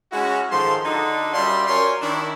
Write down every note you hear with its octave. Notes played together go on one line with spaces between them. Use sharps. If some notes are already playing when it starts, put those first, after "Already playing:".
G#3 C#4 E4 F#4
G#2 D#3 F3 A4 C6
D3 D4 D#4 F#4 A4
F#2 G3 F4 D5 E5 C6
F#2 A#4 C#5 D5 G#5 C6
D#3 D4 E4